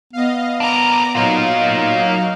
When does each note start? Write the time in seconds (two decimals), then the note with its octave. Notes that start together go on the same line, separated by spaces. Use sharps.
0.13 B3 D#5 F5
0.60 D4 A#4 A#5 D6
1.15 F#3 A#3 D#4 F4 F5